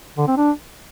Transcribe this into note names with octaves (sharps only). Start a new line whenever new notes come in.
D3
C4
D4